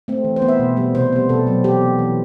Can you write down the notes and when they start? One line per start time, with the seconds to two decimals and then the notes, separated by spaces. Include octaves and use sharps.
0.08 A3 C4
0.24 E3
0.36 C5
0.42 B3
0.48 E5
0.59 B2
0.76 G3 B3
0.94 C3 C5
1.12 G3 B3
1.29 B2 A4
1.47 F#3 C4
1.64 E3 G4
1.81 B3
1.99 E3